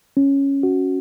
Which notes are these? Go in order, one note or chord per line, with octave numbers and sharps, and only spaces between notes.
C#4
F#4